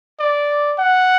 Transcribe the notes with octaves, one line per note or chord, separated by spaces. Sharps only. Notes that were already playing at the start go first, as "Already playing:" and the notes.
D5
F#5